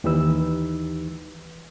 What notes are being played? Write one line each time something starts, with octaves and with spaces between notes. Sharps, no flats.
D#2 E3 D#4 G4 B4 E6